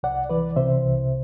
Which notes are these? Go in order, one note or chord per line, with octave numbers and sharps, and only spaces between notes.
C2 D5 F#5
E3 B4 D5
C3 C5 E5
C2